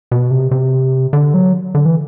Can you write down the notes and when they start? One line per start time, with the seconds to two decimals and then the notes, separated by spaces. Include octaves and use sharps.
0.12 B2
0.31 C3
0.51 C3
1.13 D3
1.34 F#3
1.75 D3
1.86 E3